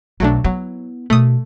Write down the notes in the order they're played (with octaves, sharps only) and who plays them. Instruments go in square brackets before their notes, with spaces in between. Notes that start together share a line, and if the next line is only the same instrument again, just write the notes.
[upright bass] B1 [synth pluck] F#3 A3 D4
[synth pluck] F#3 [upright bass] B3 E4
[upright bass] B2 [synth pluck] A3 D#6